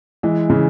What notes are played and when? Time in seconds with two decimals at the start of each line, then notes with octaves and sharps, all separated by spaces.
0.23 E3 G#3
0.50 C#3 E3